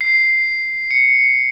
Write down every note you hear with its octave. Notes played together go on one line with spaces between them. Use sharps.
C7
C#7